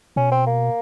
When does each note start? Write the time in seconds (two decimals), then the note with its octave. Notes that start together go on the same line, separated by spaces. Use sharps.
0.16 B2 C#4
0.32 C4
0.47 A#3